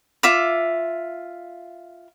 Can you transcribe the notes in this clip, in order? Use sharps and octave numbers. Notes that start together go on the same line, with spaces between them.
F4 E5 D6